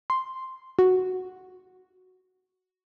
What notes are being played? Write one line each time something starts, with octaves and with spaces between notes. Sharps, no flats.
C6
F#4